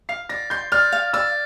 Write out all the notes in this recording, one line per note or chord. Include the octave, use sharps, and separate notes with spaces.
F5 C7
D5 A#6
C6 G6
D5 F6
F5
D5 E6